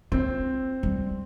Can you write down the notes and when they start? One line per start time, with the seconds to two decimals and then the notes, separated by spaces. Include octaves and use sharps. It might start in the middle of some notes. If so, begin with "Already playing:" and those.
0.12 C4 F4
0.83 G3